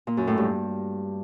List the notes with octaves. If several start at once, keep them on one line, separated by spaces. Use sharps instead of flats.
A#2
F#2
A2
G2